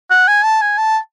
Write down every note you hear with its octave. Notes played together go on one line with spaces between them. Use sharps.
F#5
G#5
A5
G#5
A5